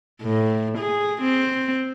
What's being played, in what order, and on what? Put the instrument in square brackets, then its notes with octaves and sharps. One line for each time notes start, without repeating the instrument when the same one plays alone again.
[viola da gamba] A2
G#4
C4